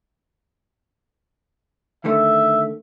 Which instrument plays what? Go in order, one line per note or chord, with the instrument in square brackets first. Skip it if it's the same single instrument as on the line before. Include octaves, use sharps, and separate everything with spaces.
[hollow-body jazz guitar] D3 D#3 A3 [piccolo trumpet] E5